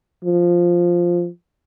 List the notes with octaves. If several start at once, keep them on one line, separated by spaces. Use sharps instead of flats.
F3